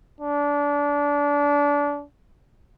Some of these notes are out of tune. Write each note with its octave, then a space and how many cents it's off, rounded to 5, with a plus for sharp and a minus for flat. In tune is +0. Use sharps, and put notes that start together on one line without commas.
D4 -25